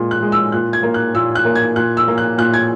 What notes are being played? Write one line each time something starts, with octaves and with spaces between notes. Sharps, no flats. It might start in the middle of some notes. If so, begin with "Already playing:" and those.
Already playing: A#2 G#3
F#6
G#3
E6
A#2 F#6
G#6
A#3
F#6
A#2 E6
F#6
A#3
G#6
A#2 F#6
E6
A#3
F#6
A#2 F#6
G#6